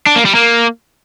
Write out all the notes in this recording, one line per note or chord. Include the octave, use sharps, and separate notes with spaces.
D4
A#3
G3
A#3